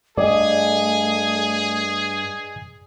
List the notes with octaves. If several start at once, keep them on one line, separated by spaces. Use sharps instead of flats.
G2 A3 G#4 D5 D#5